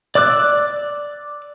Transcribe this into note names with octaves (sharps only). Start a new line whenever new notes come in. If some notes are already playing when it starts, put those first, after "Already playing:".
D5 D6 E6 F#6